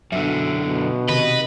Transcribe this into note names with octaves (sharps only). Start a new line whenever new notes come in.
F#2 B2 D3 E5
B2
C3 D#3 B4 D#5